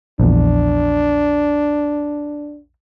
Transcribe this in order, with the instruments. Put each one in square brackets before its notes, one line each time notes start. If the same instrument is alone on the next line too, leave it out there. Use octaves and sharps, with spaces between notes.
[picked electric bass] A#1 E2 [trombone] D4